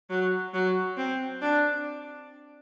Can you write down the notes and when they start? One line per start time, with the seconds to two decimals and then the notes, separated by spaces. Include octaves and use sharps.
0.10 F#3
0.54 F#3
0.98 C4
1.42 D4